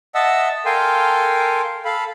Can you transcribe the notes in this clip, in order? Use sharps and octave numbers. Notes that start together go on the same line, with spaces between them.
D#5 E5 F#5 A5 E6
A4 A#4 F5 G5 G#5 C6
A4 F5 B5